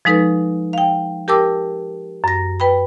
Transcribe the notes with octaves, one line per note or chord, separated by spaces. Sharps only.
F3 G#3 D#4 A4 B4
F5 G5
G4 A#4 G5 A5 D6 E6
F#2 A#6
B4 G5 B5